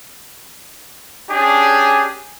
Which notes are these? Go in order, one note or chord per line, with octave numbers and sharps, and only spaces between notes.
C#4 D4 G4 G#4